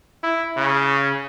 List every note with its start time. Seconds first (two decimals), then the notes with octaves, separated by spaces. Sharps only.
0.23 E4
0.57 C#3